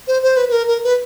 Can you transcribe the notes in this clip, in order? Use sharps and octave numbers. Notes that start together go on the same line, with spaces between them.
C5
C5
B4
B4
A#4
A#4
B4